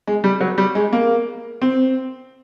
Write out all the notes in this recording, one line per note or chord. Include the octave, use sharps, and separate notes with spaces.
G#3
G3
F#3
G3
G#3
A#3
C4